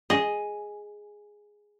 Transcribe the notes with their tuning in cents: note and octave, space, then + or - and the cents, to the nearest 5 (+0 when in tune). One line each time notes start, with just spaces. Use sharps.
G#4 +0 D#5 +0 G#5 +0